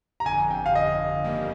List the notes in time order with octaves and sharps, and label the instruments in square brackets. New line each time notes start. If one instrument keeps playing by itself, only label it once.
[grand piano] A#5
[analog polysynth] G1 F2 D3 [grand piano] G#5
[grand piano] G5
F5
D#5
[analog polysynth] G1 F2 D#3 G3 A#3